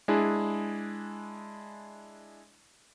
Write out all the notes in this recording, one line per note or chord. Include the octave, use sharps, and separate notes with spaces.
G#3 D4 E4 G#4